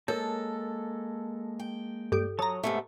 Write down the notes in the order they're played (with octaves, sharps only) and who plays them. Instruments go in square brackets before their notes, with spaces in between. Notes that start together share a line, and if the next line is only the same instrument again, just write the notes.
[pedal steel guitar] G#3 A#3 A5 [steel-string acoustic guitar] A4 [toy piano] A#4 C#5
[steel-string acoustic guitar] G5
[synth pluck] G2 G4 [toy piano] A4
[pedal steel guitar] F#3 C#5 D#6 [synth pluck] A5 A#5
[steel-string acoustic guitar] G#2 C3 A3 [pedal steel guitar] B3